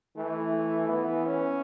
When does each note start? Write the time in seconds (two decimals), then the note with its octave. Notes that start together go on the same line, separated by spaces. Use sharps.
0.16 E3 A3
0.52 A3
0.88 E3 B3
1.26 C#4